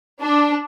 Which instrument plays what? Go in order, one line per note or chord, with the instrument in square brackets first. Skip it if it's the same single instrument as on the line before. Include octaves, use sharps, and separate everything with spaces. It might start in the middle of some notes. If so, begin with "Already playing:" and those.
[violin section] D4